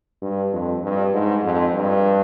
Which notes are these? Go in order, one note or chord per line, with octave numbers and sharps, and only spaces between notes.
G2
F2
G2
G#2
F2
G2